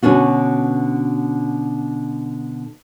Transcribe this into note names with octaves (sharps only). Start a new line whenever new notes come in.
B2 D3 C#4 D4 F#4